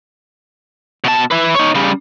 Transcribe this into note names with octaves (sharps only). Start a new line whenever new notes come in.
B2 A5
E4 B4
D#4 C#5
C#3 G3